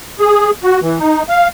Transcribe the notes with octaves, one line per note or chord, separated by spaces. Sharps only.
G#4
F#4
E3
D#4
F5